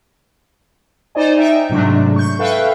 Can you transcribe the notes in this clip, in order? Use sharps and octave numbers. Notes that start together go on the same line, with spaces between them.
D#4 C5 D5 D#5 G#5
D#4 E5 G5
G#2 C3 F#3 G#3 A3 D4
C#6 G6
A4 B4 E5 F5 G5